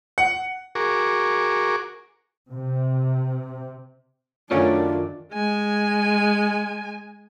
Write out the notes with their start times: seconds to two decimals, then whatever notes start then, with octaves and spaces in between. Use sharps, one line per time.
0.18 F#5
0.75 F#4 G#4 A#4 C#6 D6
2.51 C3
4.51 F#2 D#3 F#3 A3 C#4 D4 F4 D5
5.32 G#3 G#5